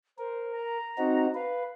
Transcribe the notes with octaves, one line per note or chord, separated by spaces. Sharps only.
A#4 C5
A#5
C4 D#4 F#4
B4 F5